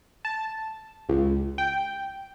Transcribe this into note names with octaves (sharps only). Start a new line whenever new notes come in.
A5
C#2
G5